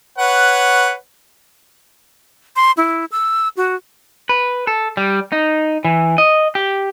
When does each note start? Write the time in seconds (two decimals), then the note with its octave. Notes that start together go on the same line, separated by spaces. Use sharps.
0.18 B4 C#5 F#5
2.56 C6
2.77 E4
3.12 E6
3.57 F#4
4.29 B4
4.67 A4
4.97 G3
5.32 D#4
5.85 E3
6.18 D#5
6.55 G4